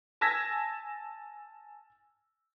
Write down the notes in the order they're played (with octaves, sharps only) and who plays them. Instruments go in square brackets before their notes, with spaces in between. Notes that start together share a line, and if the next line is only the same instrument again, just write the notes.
[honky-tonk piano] G#5 A5 E6 G#6 A#6 B6